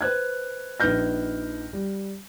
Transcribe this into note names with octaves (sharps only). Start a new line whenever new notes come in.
B4 C5 F#6 G#6
A#1 D#4 B4 F6 G6 A#6
G3